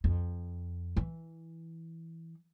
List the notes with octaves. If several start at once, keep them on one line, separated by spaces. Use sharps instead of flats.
F2
E3